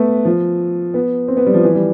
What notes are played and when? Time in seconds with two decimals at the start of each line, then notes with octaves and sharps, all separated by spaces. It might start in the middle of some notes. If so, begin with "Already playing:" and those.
Already playing: A3 B3
0.25 F3
0.94 B3
1.28 C4
1.37 B3
1.46 G3
1.54 F3
1.64 E3
1.75 G3